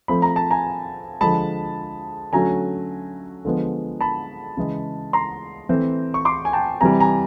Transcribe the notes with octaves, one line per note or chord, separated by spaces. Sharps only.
F3 A3 C4 B5
A#5
A5
G#5 A#5
D3 F3 G#3 A5 B5
D3 F#3 A3 C#4 G#5 A#5
D3 F3 G#3 B3
A5 B5
C#3 E3 G#3
A#5 C6
E3 A3 C4
C#6
C6 D6
G#5
G5 A5
C3 E3 G3 G#5 A#5
G#5 A#5